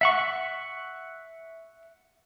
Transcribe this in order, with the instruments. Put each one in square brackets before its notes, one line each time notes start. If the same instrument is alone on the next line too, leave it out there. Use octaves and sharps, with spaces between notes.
[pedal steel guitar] E5 F#5 C#6